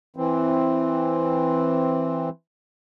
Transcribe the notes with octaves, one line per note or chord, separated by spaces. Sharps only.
E3 C4